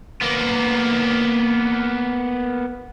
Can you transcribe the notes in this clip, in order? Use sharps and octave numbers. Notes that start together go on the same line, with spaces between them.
A#3 B3